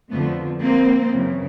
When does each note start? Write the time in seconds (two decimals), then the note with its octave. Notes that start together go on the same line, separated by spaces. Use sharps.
0.11 F2 D3 F3 A3 B3
0.60 A#3 C4
1.11 F#2 C#3 E3